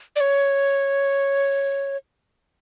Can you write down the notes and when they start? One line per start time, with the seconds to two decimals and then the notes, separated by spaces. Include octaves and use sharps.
0.16 D5
0.21 C#5